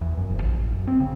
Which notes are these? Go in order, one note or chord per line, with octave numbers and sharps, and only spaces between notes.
E2
F#2
F#1
A#1
A1
F#2
C4
C#3